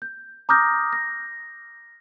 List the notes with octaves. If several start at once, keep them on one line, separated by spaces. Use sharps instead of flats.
G6
A#5 D6 D#6 F6 G6 A#6
A#6